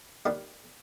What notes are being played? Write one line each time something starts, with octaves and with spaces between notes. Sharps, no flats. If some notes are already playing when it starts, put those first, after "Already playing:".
D#2 D#3 G3 G4